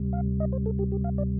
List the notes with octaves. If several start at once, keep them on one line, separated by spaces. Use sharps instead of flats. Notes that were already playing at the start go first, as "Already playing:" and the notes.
Already playing: D2 C3 G3
F5
D#5
C5
A4
G4
G4
F5
D5